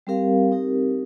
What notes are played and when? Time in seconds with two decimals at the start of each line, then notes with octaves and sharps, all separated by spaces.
0.07 G3 C4 G4 A#4 F5
0.52 C4 D#4 G4 A#4